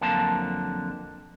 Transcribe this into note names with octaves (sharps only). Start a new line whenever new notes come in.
F2 D3 F#3 A#3 A5